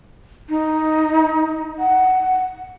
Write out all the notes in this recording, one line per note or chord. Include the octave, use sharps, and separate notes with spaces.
D#4
F#5